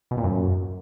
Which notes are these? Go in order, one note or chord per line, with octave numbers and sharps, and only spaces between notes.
B2
A#2
F#2